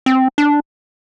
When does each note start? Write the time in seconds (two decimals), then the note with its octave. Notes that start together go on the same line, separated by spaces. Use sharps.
0.06 C4
0.38 D4